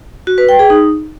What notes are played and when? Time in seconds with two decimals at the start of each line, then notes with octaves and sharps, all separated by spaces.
0.27 F#4
0.38 B4
0.49 G5
0.59 G#4
0.70 D#4